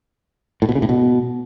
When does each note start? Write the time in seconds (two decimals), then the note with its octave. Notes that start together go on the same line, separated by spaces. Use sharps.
0.62 A2
0.69 B2
0.75 C#3
0.82 A2
0.89 B2